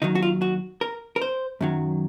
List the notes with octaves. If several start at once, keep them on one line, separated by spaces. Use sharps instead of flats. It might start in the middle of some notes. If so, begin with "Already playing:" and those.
D#2 D#3 F#3 D#4
F#4
F4
F#4
A#4
A#4
C5
F#2 D#3 F#3